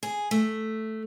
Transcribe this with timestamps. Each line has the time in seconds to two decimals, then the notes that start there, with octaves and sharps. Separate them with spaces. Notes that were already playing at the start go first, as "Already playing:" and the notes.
0.03 G#4
0.31 A3